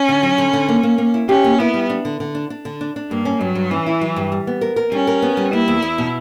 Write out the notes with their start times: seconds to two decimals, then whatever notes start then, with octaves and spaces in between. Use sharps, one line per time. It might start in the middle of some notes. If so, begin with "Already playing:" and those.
Already playing: C#4
0.09 D3
0.23 F#3
0.38 D3
0.53 D3
0.69 A#3
0.83 A#3
0.98 A#3
1.14 E4
1.29 C#4 G4
1.44 A#3
1.59 B3 E4
1.74 G3
1.90 D4
2.05 D3
2.20 D3
2.35 D4
2.50 D4
2.65 D3
2.81 D4
2.96 D4
3.11 G2 A#3
3.25 C#4
3.41 G2 F#3
3.55 G2
3.71 E3 C#4
3.86 E4
4.01 F#3
4.16 G2
4.32 G3
4.47 B3
4.61 A#4
4.76 A#4
4.92 G3 C#4
5.07 A#4
5.22 B3
5.37 G3
5.53 A#3 E4
5.68 E2
5.82 E2
5.98 B2